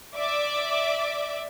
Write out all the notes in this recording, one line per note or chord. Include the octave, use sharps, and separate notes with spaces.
D5 E5 D6